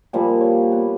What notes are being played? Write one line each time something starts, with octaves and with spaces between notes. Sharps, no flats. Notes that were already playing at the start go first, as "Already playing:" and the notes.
A#2 F3 G3 A#3
C#5
B3